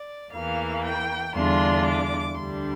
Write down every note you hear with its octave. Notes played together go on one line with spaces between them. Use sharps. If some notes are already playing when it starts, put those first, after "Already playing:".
Already playing: D5
E2 E3 A#3 F5
G5
E2 D3 G3 D4 F4 C6
D6
D2 D3 G3 D4 C6